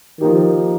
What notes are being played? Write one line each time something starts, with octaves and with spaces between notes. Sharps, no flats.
D#3 F3 A#3 D#4 G4